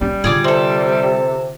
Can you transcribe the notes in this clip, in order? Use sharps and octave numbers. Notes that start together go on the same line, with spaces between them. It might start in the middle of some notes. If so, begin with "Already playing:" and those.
G3 C#4
D3 F4 G#4 D5 D6
C3 C4 A4